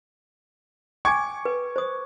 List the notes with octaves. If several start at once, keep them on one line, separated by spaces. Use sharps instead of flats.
G5 G#5 C#6 D6 G#6
B4
C5 D#6